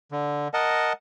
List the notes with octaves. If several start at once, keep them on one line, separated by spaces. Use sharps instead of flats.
D3
A#4 D#5 F#5 A5